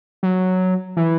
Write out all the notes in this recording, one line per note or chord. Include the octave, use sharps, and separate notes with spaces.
F#3
E3